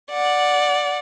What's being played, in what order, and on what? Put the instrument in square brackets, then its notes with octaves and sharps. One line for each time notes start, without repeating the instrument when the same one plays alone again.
[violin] D5 F#5